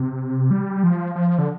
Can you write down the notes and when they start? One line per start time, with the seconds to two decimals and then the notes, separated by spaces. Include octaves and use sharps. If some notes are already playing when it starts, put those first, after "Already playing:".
Already playing: C3
0.51 G3
0.83 F3
1.16 F3
1.38 D3